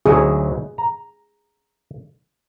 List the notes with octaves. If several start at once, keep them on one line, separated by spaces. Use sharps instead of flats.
D2 F#3 D#4 G#4
A#5